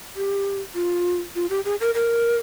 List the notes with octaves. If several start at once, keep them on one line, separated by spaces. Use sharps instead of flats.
G4
F4
F4
G4
G#4
A#4
A#4